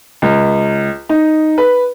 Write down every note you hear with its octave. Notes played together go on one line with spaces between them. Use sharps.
C#2
D#4
B4